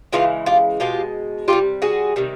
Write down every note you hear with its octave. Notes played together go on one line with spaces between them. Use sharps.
C#3 E3 G#3 F4 G4
F4 G4
B2 G#3 F4 G4
C3 E3 F4 G4
G3
F#4 G#4
C3 D#3 G3